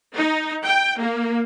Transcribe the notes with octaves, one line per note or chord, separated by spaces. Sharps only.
D#4
G5
A#3